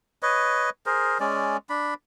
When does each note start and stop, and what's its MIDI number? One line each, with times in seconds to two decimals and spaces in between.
0.23 0.70 71
0.23 0.70 73
0.23 0.70 75
0.86 1.18 68
0.86 1.18 70
0.86 1.18 72
1.20 1.57 56
1.20 1.57 61
1.20 1.57 74
1.69 1.94 62
1.69 1.94 83